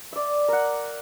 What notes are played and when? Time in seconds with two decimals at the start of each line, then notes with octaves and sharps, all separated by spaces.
0.13 D5 E5
0.48 A#4 F#5